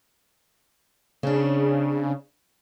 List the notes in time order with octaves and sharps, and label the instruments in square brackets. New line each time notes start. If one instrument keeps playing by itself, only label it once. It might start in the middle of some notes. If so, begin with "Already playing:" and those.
[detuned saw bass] C#3 [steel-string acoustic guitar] C4 D4